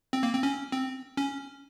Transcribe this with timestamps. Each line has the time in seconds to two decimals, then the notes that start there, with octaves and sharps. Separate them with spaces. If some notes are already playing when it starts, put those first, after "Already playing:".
0.13 C4
0.23 A#3
0.33 C4
0.43 C#4
0.72 C4
1.17 C#4